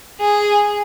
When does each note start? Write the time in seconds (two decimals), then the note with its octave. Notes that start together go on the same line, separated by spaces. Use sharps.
0.21 G#4